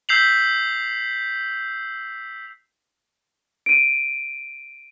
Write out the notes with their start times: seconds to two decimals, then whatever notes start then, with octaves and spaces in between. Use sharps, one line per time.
0.09 E6 G6 B6 C7 F7 F#7
3.66 D7 D#7